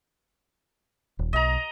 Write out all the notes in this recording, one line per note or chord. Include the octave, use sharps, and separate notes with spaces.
D#1
B1 D#5 A#5